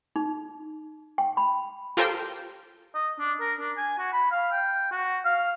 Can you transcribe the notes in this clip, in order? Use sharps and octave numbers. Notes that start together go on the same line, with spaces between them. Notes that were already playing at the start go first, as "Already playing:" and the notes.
D#4
G5
B5
F4 G4 A4 A#4 C5 G5
D#5
D4
A#4
D4
G#5
F#4
B5
F5
G5
F#4
F5